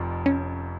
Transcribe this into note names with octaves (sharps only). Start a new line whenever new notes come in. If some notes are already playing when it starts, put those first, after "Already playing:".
Already playing: F1 F2 F3
C#4